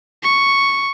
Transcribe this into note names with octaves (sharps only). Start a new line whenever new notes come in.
C#6